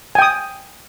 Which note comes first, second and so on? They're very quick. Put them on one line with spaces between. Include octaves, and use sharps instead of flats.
G#5 G5 D#6